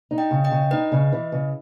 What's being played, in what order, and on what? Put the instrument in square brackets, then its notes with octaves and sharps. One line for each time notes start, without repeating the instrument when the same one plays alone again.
[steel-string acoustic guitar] D#4
[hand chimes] D#5 G5
[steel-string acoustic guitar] C#3
[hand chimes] D#5 G5
[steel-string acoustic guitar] C#3
[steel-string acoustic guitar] D#4 [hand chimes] B4 D#5
[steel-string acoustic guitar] C#3
E3
C#3